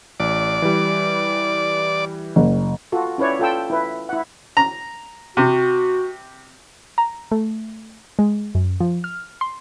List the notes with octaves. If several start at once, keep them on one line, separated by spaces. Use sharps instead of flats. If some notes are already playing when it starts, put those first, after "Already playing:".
A1 D5
E3 G3
F#1
F4 F#4 A4
C#4 E4 B4 C#5 D5
F4 A4 G5 E6
E4 B4
E4 F#5
A#5
C3 F#4
A#5
A3
G#3
F#2
F3
F6
C6